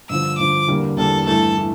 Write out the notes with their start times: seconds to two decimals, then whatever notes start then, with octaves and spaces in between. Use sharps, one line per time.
0.09 G2 D3 F3 E6
0.38 G2 D3 F3 D6
0.68 E2 D3 G3 A#3
0.97 E2 D3 G3 A#3 A4
1.26 G2 E3 A3 A4
1.57 E3 A3